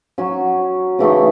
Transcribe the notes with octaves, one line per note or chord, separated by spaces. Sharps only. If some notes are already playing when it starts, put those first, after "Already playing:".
F#3 C#4 F#4
C#3 E3 A3 D#4